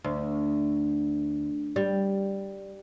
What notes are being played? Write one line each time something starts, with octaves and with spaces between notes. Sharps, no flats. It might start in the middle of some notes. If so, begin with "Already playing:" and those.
D2
G3